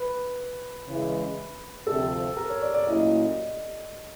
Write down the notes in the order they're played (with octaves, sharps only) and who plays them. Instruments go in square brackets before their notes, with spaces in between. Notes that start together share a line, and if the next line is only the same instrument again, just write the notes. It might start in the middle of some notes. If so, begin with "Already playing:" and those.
Already playing: [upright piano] B4
[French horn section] C#3 E3 G#3
[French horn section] D2 C3 F3 [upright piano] A4
[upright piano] A#4
C#5
D5
D5
[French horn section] A#2 F#3 A3 C#4 E4 [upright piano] D#5